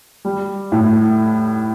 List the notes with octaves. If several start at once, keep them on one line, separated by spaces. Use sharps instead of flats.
G3
A2